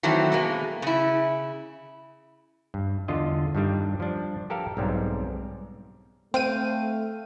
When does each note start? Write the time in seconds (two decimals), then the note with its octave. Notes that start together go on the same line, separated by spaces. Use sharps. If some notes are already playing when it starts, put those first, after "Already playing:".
0.03 D#3 E3 F#3 A3 C4
0.32 B2 G#3 A#3
0.82 C#3 E4
2.74 G2
3.08 E2 D3 F4 D#5
3.55 G2 D#3 G3 D4
4.00 F3 D4
4.50 G4 A4 A#4 F5
4.77 B1 G#2 G3 C4
6.34 A3 C4 F5 G5 D#7